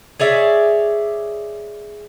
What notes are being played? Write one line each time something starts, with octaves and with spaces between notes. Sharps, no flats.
G#4 C#5 D5 E5